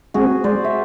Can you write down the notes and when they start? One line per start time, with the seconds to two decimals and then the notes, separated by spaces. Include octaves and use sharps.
0.14 G#3 C4 F#4 G#4
0.44 G#3 C5 D5
0.64 E5